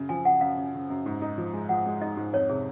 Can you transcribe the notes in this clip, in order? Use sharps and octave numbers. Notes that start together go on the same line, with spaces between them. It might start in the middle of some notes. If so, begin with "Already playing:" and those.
Already playing: F#2 C#3
F3 G#5
F#2 F#5
F#2 F5
C#3
C#3
F#2
G#2
D#4
F3
G#3
F3 F#5
G#3
D#4 D#5
G#2
F2 C#5
C3 G#4